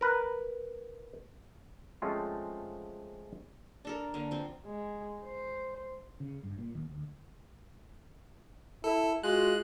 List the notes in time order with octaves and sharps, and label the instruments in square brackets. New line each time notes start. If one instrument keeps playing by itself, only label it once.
[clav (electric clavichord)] A#4 B4
F3 G#3 A3 C4 C#4 F4
[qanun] D4 A4 A#4
D3 A#3
F3 C4
[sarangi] G#3
C5
[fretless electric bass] C#3
G2
A#2
D#2
D2
[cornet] E4 [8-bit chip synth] A4
[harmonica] G#3 [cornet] F4 [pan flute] F#4 [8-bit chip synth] F#6